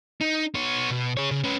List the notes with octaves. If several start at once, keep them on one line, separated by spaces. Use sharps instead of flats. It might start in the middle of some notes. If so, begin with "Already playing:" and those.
D#4
B3 C#5
B2
G#4 C#5
C#3
C#4 B4